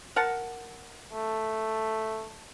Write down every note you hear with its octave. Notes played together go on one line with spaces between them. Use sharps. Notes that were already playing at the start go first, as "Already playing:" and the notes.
A#4 F#5 A5
A3